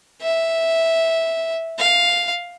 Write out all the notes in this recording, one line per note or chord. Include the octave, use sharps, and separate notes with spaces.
E5
F5